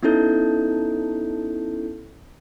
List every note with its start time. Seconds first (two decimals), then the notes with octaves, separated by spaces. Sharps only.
0.03 B3 C#4 D#4 E4 A4 G6